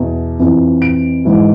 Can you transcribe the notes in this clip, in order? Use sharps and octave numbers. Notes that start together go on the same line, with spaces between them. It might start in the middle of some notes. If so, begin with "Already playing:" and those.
Already playing: E2 B2
F2 E3
D7
G#2 E3